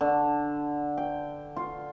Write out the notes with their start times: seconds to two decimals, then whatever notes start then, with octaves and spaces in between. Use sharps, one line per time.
0.01 D3
0.97 G5
1.56 F4